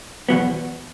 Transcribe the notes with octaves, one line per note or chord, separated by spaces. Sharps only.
E2 B2 F#3 B3